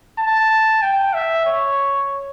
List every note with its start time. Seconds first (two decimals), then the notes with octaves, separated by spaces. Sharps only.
0.18 A5
0.82 G5
1.14 E5
1.46 C#5